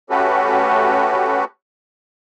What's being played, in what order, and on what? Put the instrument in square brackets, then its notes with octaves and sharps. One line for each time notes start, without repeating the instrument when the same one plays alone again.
[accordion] A3 C#4 F#4 G4 A4 B4